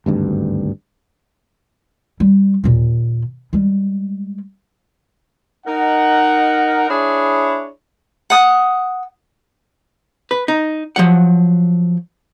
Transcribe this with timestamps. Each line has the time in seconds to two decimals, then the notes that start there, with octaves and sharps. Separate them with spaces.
0.06 G#1 D2 G2
2.20 G3
2.64 D#2 A#2
3.53 G3 G#3
5.66 D#4 A#4 F#5
6.89 D4 E4 G#4 C#5 B5
8.30 F#5 D#6
10.31 B4
10.48 D#4
10.96 F3 F#3 F#5